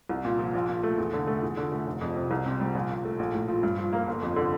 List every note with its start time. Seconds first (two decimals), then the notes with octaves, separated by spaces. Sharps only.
0.09 C2
0.25 A#2
0.39 F3
0.54 A#1
0.69 A#2
0.83 A3
0.98 E2
1.13 D3
1.27 A3
1.43 E2
1.57 D3
1.72 A3
1.87 F1
2.01 F2
2.16 C3
2.31 C2
2.46 C3
2.60 G3
2.75 A#1
2.90 A#2
3.05 A3
3.19 A#1
3.34 A2
3.48 F3
3.63 G2
3.78 F3
3.93 A#3
4.07 G1
4.22 F2
4.36 D3